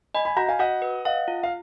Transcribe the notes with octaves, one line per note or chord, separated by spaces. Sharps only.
D#5 G#5 B5
G#5 B5
F#4 F#5 A#5
F5 G#5
F#4 D#5 F#5
B4
D#5 F5 F#5
F4
F5